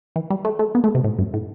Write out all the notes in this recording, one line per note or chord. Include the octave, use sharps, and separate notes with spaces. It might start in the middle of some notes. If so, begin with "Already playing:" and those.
E3
G3
A3
A3
B3
A3
C3
A2
G2
A2